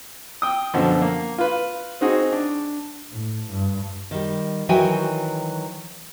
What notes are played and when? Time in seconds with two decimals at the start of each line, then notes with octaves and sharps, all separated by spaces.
0.42 G5 D#6
0.74 F#2 B2 D3 F3
1.02 A#3
1.38 F4 B4
2.01 C4 D#4 F#4 G#4
2.32 D4
3.11 A2
3.51 G2
4.11 D#3 G3
4.69 D#3 E3 F#3 F#4 G5 G#5